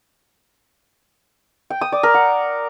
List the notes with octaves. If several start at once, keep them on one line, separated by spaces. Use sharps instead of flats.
G5
D#6
D5
A#4
F#5